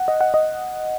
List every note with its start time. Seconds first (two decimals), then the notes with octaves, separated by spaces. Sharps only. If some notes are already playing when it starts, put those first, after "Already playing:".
Already playing: F#5
0.08 D#5
0.21 F#5
0.34 D#5